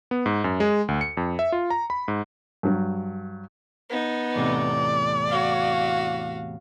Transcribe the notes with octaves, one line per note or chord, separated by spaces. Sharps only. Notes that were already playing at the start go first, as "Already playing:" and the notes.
B3
G#2
F#2
G#3
D2
C#7
F2
E5
F4
A#5
B5
G#2
G2 F#3
B3 D#4
E2 A2 C3 D5
F#4 F5